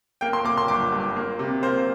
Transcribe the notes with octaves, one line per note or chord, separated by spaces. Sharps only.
A#3 G5
C6
A#3 D6
C6
G1 D6
G2
A#3
C3
A#3 C5